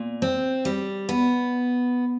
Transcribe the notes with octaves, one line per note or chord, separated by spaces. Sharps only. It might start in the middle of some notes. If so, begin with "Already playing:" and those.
Already playing: A#2
C4
G3
B3